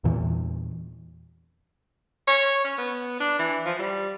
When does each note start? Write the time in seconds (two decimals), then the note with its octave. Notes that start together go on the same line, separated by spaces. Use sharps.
0.04 E2 A#2 E3
2.27 C#5
2.64 C#4
2.78 B3
3.20 D4
3.39 E3
3.65 F3
3.79 G3